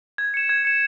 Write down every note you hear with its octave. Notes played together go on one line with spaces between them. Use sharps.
G#6
C#7 E7
G#6
C#7 E7